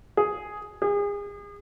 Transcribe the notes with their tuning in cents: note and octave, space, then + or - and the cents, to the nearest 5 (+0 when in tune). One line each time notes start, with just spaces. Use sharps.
G#4 +5
G#4 -35